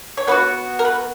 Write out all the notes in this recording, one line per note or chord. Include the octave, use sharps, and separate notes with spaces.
C#5
B3 D#4 F#4 B4
A#4
B4